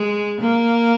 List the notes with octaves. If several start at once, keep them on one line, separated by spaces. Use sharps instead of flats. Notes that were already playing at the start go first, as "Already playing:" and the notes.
Already playing: G#3
A#3